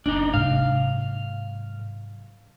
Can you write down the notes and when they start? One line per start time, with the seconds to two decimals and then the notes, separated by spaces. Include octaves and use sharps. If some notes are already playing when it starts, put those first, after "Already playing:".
0.06 F#1 D4 D#4
0.34 G#2 C3 F#3 F5